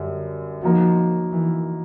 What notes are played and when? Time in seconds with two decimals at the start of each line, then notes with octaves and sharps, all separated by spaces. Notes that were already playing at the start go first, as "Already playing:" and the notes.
Already playing: F#2 D3 G3
0.62 F3 F#3 A#3 D#4
1.32 E3